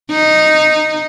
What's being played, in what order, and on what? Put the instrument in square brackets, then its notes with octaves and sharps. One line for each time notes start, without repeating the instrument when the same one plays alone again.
[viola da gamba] D#4